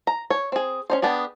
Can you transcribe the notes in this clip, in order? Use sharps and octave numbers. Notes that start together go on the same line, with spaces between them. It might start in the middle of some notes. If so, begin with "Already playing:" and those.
A#5
C#5
C4 G#4
C#4 D#4 C5
B3 D4 G4 G#4